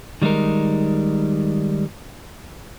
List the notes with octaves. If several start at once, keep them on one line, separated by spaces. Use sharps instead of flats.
D#3 G3 G#3 D#4 A#4